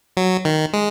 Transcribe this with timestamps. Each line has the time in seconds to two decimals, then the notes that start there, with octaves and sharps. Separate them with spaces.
0.17 F#3
0.45 D#3
0.73 G#3